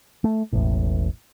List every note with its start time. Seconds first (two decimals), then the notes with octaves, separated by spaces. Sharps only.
0.24 A3
0.53 E1 A1 A2